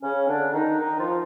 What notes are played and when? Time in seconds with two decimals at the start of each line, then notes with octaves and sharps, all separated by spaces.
0.02 C#3 C#4
0.28 D3 D4
0.53 D#3 D#4
0.79 D#3 D#4
0.98 F3 F4